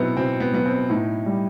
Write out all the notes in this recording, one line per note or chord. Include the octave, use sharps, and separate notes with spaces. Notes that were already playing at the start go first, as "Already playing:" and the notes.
Already playing: B2 F#3 B3 C4 D#4 E4
B2 C4
B3
F#3 B3
C4
A2 D#4
G3